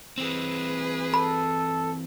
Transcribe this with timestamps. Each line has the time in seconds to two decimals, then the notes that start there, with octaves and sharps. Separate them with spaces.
0.18 E3 C4 G#4 B4
1.14 A4 B5